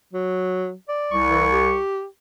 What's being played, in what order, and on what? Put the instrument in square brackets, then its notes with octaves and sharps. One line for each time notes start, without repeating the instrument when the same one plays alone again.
[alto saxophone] F#3
D5
[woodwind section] C2 C#6
[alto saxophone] E3
G4